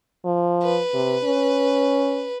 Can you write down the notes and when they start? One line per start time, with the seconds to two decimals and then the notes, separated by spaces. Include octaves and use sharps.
0.25 F3
0.63 B4
0.94 C3
1.24 C#4